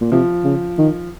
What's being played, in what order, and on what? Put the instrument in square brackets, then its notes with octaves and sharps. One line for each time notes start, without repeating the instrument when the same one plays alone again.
[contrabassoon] A#2
[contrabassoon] C3 [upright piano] F3
[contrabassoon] C#3
D#3